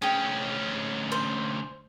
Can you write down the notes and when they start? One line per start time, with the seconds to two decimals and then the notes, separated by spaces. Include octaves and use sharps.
0.02 D2 C#4 G#4 G5
1.12 C5